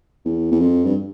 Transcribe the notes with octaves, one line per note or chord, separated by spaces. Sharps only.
E2
E2
F2
G2